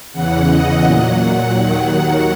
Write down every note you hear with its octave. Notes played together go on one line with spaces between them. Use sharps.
E2 C#3 E3 F#5
D#5
A#2 F#3 F#5
F#5
D#2 D#3 F#3